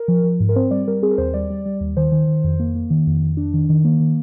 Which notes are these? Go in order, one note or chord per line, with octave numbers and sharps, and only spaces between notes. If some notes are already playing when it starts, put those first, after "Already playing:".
Already playing: A#4
F3
F3
G#2
A#4
C4 C5
G3 D5
G3 A#4
C4 G#4
A#4
D#2 C5
G3 D5
G3
G3
D#2
D#3 C5
D#3
D#3
F2
A#3
A#3
D#3
F2
F2
D4
D#3
D#3
A#3
D#3